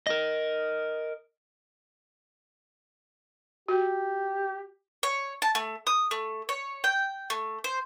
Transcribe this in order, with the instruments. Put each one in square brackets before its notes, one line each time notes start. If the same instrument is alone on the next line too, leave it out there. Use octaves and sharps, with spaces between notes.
[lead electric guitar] A#4 D#5
[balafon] F#4 [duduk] G4
[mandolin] C#5
A5
A3
D#6
A3
C#5
G5
A3
C5